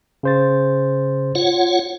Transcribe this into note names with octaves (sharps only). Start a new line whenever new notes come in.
C#3 C5 A6
F4 C#5 F#5